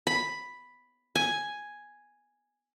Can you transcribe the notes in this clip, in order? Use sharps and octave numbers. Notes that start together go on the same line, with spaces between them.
B5
G#5